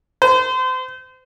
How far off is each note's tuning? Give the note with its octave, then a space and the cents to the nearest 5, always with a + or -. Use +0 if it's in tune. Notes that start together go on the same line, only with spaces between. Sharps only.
C5 -35